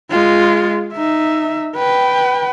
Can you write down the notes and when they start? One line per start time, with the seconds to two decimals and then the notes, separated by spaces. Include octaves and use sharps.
0.11 G#3 F4
0.93 D#4 E5
1.76 B4 G5